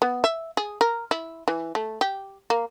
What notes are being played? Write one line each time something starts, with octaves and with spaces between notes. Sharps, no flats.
B3
E5
G#4
A#4
E4
E3
A3
G4
A#3